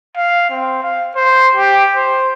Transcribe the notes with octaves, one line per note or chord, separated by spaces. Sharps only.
F5
C4
F5
C5
G4
C5